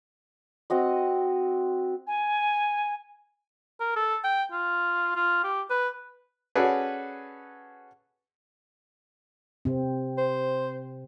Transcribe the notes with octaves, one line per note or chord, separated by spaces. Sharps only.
C4 F#4 D#5
G#5
A#4
A4
G5
F4
F4
G4
B4
C#4 F#4 G#4 A4 B4 D5
C3 C4
C5